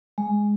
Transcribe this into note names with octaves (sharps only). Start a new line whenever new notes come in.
G#3